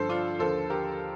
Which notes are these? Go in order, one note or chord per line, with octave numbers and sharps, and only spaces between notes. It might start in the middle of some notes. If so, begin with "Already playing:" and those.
Already playing: G2 D3 F3 A4 C5
D4 F4
D#2 D3 F3 A4 C5
G4 A#4